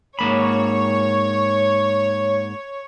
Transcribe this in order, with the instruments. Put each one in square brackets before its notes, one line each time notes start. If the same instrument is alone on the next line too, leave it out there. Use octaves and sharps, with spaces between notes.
[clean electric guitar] G#2 A#3 B5 [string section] C#5